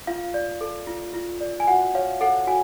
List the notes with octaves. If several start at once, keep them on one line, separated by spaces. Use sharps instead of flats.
F4 F5
D5
A4
F4
F4
D5
G#5
F#4 F#5
C#5 F5
A4 F#5
F#4 G#5